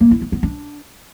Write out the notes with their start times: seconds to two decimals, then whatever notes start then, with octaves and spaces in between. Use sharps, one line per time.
0.01 A#3
0.11 E4
0.22 B3
0.32 B3
0.43 D4